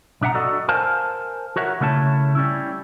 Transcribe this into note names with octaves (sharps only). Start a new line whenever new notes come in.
B1 D4 E5 F#5 A#5
F#4 A4 D5 D#5
A#4 C5 F5 G#5 A5
F#4 A#4 C#5 E5 F#5
C#3 A3 C#4 E4 A5
G3 C#4 E4